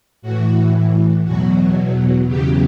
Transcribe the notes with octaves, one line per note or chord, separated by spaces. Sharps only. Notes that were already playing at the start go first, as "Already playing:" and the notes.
A2 E3 F#4
E2 B2 F#3 F#4
E2 C#3 F#3 G4